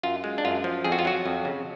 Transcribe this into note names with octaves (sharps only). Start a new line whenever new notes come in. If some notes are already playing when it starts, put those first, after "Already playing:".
F#2 F4
G#3
D4
F#2 F4
F3
F2 G#4
F#4
F4
F#3 F#4
F2
C#3